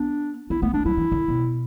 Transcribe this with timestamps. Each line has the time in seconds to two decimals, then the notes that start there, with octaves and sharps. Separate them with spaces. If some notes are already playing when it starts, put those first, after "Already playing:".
Already playing: B3 D4
0.50 B3 E4
0.62 A3 B3
0.74 A3 D4
0.85 F#3 E4
0.97 E3
1.12 D3
1.28 B2